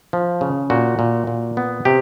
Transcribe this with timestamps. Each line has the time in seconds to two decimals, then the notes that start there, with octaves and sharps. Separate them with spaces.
0.13 F3
0.41 C#3
0.70 A#2 F#4
0.99 A#2
1.27 A#2
1.57 B3
1.85 C3 G4